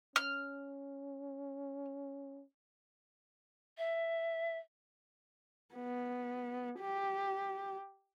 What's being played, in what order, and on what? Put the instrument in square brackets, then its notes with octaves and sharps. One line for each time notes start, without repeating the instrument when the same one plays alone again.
[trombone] C#4 [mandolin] F6
[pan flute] E5
[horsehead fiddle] B3
G4